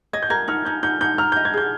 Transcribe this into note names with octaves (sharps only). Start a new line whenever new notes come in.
D#5 G#6
G6
A#4 G#6
D#4 F6
D#4 G6
D#4 G6
D#4 G6
A#5 F6
G6
D#5
G#6
G#4 G6